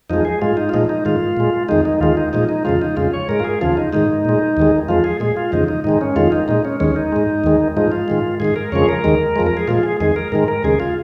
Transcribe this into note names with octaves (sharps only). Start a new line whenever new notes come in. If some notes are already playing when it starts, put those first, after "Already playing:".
F2 F3 G#3 D#4
G#4
G#2 G#3 F4
D#4
F4
A#2 F3 G#3 D#4
D#4
G#2 D#3 G#3 F4
A#2 G#3
F2 D#3 G#3 D#4
D#4
D#2 D#3 G#3 F4
D#4
A#2 F3 G#3 D#4
D#4
F2 C#3 F3 G#3 F4
D#4
F2 C#3 G#3 F4
C#5
G#2 G#3 A#4
F4
G#4
D#2 C#3 F3 F4
D#4
G#2 D#3 G#3 D#4
A#2 G#3
D#2 D#3 G#3
F2 F3 G#3 F4
G#4
A#2 G#3 G#4
F4
F2 C#3 F3 G#3 D#4
D#4
G#2 D#3 G#3 D#4
C#4
F2 D#3 G#3 F4
D#4
A#2 G#3 D#4
C#4
D#2 D#3 G#3 C#4
D#4
G#2 G#3
D#2 D#3 G#3
G#2 F3 G#3 D#4
F4
G#2 D#3 G#3
G#2 D#3 G#3 G#4
A#4
F2 C#3 F3 G#3 C#5
G#4
A#4
D#2 D#3 G#3
F2 F3 G#3
A#4
G#4
A#2 F3 G#3 F4
G#4
F2 D#3 G#3 G#4
A#4
G#2 D#3 G#3 A#4
A#4
D#2 C#3 G#3 G#4
F4